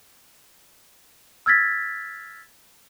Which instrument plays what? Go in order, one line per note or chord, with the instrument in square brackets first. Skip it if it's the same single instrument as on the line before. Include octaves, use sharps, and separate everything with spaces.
[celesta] E6 F6 G#6 A6 B6